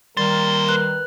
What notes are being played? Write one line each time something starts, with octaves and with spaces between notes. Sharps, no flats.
D#3 G3 A#3 A#4 C5 A6
B4 F#6